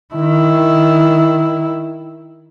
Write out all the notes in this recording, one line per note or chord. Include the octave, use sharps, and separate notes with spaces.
D#3 E4